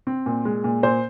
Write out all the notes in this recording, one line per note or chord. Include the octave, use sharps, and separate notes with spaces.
C4
A#2
G#3
A#2
A#2 C5